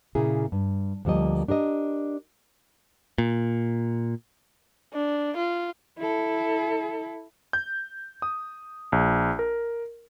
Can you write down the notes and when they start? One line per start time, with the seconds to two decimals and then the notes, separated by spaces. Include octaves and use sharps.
0.15 A#2 C#3 A#3 E4 G#4
0.52 G2
1.05 D2 F3 G3 A#3 D#5
1.48 D4 G4 A#4 D#5
3.18 A#2
4.94 D4
5.36 F4
5.98 E4 A4
7.53 G6
8.22 D#6
8.92 A#1
9.39 A#4